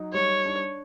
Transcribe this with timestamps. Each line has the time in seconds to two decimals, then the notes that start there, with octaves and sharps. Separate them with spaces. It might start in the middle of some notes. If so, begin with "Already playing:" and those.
Already playing: F#3 D#4
0.14 G3 C#5
0.46 D4